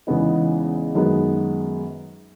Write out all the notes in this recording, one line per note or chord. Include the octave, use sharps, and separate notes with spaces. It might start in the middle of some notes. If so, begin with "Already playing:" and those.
E2 C#3 G#3 B3 D#4
F#2 D#3 G#3 B3 F#4